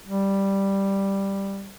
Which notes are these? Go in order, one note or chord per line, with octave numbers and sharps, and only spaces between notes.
G3